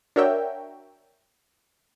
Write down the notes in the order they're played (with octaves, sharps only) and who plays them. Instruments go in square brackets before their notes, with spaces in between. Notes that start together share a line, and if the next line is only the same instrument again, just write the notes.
[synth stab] D4 F#4 A#4 C#5 E5 G5